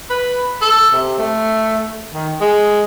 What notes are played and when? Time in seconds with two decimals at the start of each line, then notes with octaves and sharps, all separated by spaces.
0.10 B4
0.62 A4
0.93 C3
1.19 A3
2.13 D#3
2.40 G#3